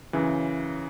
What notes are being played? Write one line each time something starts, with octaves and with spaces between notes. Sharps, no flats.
F#2 C#3 E3